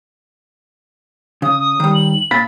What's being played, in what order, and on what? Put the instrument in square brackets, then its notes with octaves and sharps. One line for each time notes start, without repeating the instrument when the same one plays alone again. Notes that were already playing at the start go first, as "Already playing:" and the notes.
[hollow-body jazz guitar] C#3 [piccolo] D#6
[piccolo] D#6
[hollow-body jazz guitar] D#3 G3
[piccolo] F#7
[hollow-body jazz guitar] A#2 F5 B5 [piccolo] A6